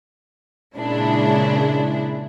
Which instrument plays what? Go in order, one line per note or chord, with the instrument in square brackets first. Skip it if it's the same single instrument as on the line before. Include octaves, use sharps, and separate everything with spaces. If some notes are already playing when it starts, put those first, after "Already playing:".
[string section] A#2 C#3 G#3 D4 E4